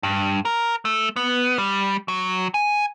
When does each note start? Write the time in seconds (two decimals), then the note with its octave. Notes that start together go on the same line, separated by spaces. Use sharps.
0.03 G2
0.45 A#4
0.85 A3
1.16 B3
1.58 G3
2.08 F#3
2.54 G#5